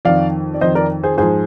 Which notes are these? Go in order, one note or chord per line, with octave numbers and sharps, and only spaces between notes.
F2 D#3 D5 F5
D5
F2 D#3 C5 D#5
A#4 D5
G#4 C5
G#2 F3 G#4 C5